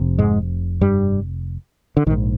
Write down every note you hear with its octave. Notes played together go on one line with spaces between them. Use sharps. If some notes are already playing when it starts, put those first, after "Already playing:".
Already playing: F1 F2 C3
G#2 G#3
G2 G3
D3
A#1 G#2 D#3